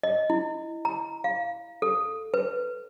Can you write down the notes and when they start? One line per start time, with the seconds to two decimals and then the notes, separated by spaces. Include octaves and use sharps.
0.03 D#5
0.30 E4
0.85 A#5
1.24 F5
1.82 A4
2.34 B4